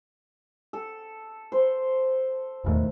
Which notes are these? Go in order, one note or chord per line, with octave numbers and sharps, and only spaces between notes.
A4
C5
E1 D#2 A2